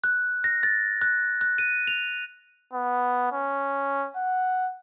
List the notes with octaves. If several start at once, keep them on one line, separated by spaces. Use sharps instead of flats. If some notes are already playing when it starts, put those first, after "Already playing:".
F#6
A#6
A6
F#6
F#6
D#7
F7
B3
C#4
F#5